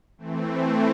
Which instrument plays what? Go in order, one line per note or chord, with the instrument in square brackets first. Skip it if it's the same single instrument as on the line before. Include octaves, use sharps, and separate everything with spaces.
[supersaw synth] E3 A3 C4